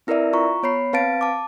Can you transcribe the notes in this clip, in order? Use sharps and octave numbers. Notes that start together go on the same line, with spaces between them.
C4 E4 A#4 B4 D5 E5
F4 A#5 C#6
B3 C#5 B5 C7
C4 B4 F5 A5 A6 D7
A5 D6